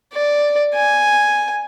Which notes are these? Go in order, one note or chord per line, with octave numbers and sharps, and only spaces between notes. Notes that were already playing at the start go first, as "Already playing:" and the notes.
D5
G#5